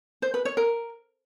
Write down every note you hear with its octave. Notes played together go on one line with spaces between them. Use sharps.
C5
B4
C#5
A#4